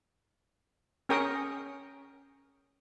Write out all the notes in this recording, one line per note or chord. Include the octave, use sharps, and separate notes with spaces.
C#4 G#4 A#4 G5 C#6 D#6